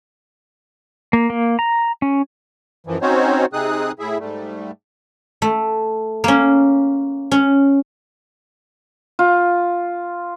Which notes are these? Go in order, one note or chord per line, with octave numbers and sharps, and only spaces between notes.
A#3
A#3
A#5
C#4
F#2 E3 F3
C4 C#4 D#4 F#4 C5 C#5
C3 C4 D#4 G#4 D#6 F#6
A2 E4 G#4 E5
G#2 G3 A3
A3
A#3 C#4
C#4
F4